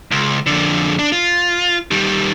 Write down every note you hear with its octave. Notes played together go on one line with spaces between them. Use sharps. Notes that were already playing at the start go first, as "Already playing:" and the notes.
C#2
F2 D3
D4
F4
D#3 G3